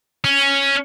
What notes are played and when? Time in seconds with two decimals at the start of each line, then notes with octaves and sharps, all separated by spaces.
0.25 C#4